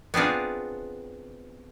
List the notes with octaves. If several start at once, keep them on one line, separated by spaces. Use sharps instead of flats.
B3 C4 D4 F4 G#4